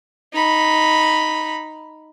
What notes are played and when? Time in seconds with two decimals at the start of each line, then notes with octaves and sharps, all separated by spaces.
0.34 D#4 B5